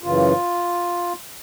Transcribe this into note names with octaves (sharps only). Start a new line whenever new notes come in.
F#2 C#3 E3 F4